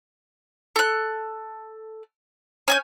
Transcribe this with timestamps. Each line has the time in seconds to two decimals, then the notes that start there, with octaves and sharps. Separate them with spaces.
0.76 A4 F#6
2.68 C#4 G#5 G6